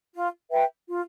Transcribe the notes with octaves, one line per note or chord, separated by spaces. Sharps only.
F4
B4 E5 G5
F4